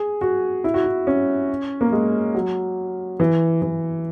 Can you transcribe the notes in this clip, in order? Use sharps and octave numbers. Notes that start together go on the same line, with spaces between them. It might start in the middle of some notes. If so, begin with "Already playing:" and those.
Already playing: G#4
F#4
E4
F#4
E4
C#4
A#3
G#3
F#3
E3
E3